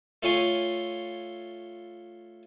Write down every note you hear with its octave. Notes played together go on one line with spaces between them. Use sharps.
A3 F4 C#5 G#5 C6